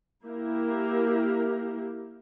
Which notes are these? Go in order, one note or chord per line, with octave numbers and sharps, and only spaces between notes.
A#3 E4 G4 A#4